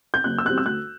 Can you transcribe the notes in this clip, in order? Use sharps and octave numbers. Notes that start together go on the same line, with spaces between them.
G6
F#1 F#6
E6
E2 B2 G3 C4 F#6
E6
D2 F#6